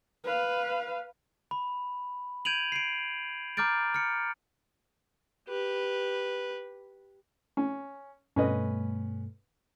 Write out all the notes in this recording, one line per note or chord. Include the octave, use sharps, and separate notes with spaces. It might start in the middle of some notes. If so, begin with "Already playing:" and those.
B4 F5
B5
G6 G#6 D7 D#7 F7 F#7
C7 D7
A#5 D6 F6 G6 A6 D7
F6 C#7
G4 B4
C#4
G2 B2 A3 C#4 B4 D#5